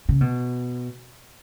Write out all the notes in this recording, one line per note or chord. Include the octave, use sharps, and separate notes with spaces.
C#3
B2